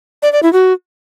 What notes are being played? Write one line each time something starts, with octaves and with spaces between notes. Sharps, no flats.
D5
D5
E4
F#4